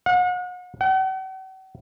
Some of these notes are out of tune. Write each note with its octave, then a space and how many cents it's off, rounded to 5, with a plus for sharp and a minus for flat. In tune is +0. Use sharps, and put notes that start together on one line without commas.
F#5 -40
F#5 +45